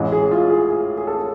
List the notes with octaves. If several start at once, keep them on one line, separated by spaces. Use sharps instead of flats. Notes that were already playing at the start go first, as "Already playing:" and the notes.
Already playing: A1 A2 E3 G#3 G#4
G#4
F4
G#4
G#4
G#4
A4